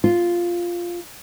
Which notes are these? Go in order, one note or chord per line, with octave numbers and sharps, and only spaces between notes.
F4